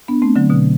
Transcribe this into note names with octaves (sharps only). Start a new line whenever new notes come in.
B3 D4
A3 C4
D3 F#3
B2 D3